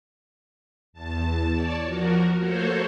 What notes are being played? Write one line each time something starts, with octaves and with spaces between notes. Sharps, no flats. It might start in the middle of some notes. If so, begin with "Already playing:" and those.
E2 A5
C#5 D5 A5
F3 F#4 A#4
A3 A#3 F#4 A4 C5 C#5